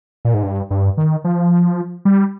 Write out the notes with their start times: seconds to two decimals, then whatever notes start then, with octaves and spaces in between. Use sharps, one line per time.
0.25 A#2
0.34 G#2
0.43 G2
0.71 G2
0.97 D#3
1.24 F3
2.05 G3